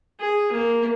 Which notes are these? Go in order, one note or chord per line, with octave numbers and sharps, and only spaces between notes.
G#4
A#3